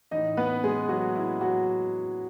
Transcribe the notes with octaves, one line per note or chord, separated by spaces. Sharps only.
A2 E3 D#4 D#5
B3 B4
G#3 G#4
F#3 F#4
E4
F#3 F#4